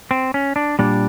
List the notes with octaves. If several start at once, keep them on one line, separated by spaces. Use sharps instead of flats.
C4
C#4
D4
A#2 G3 D4